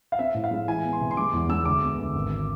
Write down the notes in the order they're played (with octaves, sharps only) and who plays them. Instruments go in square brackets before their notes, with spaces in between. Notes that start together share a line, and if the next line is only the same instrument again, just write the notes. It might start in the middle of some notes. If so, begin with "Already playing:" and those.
[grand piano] F5
C4 E5
A2
F5
G#3
E3 G#5
B3
C6
C3
C6
G#3 D6
E2
G#3 E6
D2 D6
B3
D2
G#1